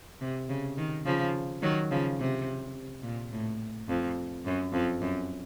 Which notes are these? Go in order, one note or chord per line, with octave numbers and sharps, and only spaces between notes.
C3
C#3
D#3
C#3 F3
D#3 F#3
C#3 F3
C3
A#2
A2
F2
F#2
F2
F#2